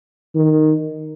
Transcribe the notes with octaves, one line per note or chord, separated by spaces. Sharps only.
D#3